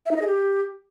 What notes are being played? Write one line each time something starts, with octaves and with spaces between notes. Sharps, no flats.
E5
D#4
D#5
G#4
G4